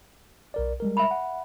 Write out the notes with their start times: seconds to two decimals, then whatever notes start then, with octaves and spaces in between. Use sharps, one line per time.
0.54 B1 A#4 D5
0.80 G3 G#3 A#4
0.97 E5 B5
1.11 F#5